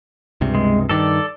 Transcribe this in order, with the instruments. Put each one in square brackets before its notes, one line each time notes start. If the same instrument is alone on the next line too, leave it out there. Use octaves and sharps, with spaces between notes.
[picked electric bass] C#2 G2 C3
[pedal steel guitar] G#3
[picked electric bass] G2 D#3 [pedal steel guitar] A4 D5